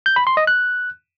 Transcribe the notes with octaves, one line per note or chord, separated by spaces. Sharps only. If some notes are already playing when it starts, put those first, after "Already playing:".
G6
B5
C6
D#5
F#6